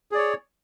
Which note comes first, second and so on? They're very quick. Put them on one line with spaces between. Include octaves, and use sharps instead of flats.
G#4 D5 C#5